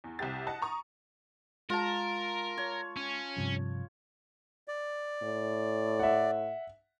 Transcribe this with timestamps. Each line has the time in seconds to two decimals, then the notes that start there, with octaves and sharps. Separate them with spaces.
0.04 E2
0.19 C2 C3 G4 A6
0.47 D#5 F#5 A5
0.62 A#5 C#6 D#6
1.70 G#3 F4 A#4 A5
2.57 C#5
2.97 C#4
3.36 G2 C3 F3
4.68 D5
5.23 A2
6.00 E5 F#5